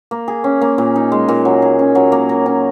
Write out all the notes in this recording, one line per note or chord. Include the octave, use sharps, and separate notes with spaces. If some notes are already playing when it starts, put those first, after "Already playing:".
A#3
G#4
C#4
A#3
A#2
D#4
G#3
A#2
F#3
G#4
C#4
F#3
A#3
A#4
C#4